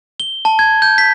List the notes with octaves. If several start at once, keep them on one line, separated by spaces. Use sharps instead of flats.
G7
A5
G#6
G6
B6